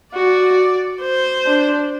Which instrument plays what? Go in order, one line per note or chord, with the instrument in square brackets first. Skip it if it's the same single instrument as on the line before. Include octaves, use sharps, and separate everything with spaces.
[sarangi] F#4 [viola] D5
[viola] C5
[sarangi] D4